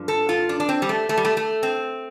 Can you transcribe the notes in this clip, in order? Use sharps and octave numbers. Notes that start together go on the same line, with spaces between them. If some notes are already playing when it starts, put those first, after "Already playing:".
Already playing: G2 D3 F3
A4
F4
D4
D4
C4
G3
A3
A3
G3
A3
A3
C4